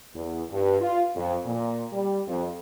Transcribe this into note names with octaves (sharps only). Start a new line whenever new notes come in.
E2
G2
F4
F2
A#2
G3
F2